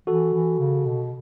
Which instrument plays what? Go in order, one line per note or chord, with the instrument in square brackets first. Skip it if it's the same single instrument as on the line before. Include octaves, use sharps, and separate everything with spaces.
[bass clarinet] E3 [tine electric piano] F#4 A4
[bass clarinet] E3
C#3
B2